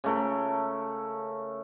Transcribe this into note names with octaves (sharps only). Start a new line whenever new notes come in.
C#3 A3 A#4